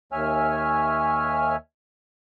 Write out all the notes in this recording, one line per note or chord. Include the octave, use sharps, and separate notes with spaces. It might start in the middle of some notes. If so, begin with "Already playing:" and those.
D#2 C#5 E5 G#5 F6